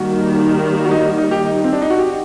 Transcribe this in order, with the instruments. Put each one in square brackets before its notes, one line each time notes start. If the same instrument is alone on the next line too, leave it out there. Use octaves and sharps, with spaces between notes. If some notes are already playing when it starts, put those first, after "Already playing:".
Already playing: [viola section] D#3 G3 A#3 [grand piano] F#4
[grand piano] F#4
D#4
D#4
G4
D#4
C4
D4
D#4
F#4
G4